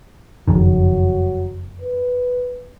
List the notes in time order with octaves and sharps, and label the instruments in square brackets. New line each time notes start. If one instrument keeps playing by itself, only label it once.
[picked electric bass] F#1 F2 D#3 [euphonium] F#3
[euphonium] B4